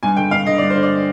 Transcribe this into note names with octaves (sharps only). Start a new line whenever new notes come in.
G2 G#5
D3 G5
G2 F5
D3 D#5
G2 D5
C5
D3
D5